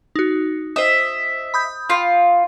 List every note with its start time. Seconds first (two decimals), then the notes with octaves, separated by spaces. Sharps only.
0.16 D#4 F#4
0.76 C5 D#5 E5 D#6
1.54 B5 D#6 G6
1.90 F4